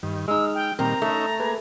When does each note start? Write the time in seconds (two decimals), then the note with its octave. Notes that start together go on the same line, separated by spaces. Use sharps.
0.03 G2 D#3
0.28 G#3 D#4 E6 F6
0.54 G5
0.79 A#2 D#3 G3 C4 A#4 A#5
1.02 A3 C#4 D#4 E5
1.40 A#3 G#4 B4